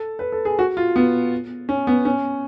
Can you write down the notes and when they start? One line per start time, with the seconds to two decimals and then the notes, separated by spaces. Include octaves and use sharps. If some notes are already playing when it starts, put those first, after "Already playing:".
Already playing: A4
0.19 B4
0.32 A4
0.45 G#4
0.59 F#4
0.77 F4
0.96 B3
1.69 C#4
1.87 B3
2.05 C#4